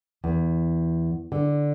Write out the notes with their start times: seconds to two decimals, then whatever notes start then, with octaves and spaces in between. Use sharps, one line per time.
0.24 E2
1.32 D3